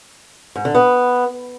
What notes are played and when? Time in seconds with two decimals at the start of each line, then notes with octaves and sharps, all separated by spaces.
0.56 G#2
0.65 D3
0.75 B3